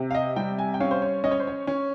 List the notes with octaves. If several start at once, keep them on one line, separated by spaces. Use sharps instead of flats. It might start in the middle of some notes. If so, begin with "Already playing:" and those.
Already playing: C3
F5
D#5
G3 G5
G#5
G5
C#4 F5
C5
C#5
C#4 D#5
C#5
C5
C#5
C#4